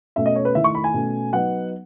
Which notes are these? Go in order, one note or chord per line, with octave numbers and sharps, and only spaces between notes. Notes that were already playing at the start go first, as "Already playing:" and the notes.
B2 A3 C#4 E5
D#5
C#5
B4
D#3 A3 E4 E5
C#6
B5
G#5
B2 A3 C#4
F#3 B3 D#4 F#5